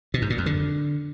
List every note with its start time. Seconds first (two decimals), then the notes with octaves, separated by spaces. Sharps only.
0.14 B2
0.22 G#2
0.30 A#2
0.38 F2
0.46 D3